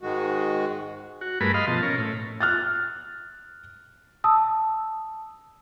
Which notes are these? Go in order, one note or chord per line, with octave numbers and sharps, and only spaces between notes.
G#2 D#3 G#3 F#4
F#4
G2 A3 G#4 A#4 B4 B5
D#5 F5 B5 C6
B2 F3 A5
C#4 A#4
A2
F6 F#6 A6
A5 D#6 E6